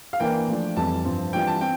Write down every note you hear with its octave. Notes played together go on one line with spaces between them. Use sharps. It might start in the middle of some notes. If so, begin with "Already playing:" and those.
F5
E3 A#3 D4 G5
F3 A3 D4
F2 E3 G3 A5
G2 F3 C4
E3 G3 D4 F4 G5
A5
C4 G5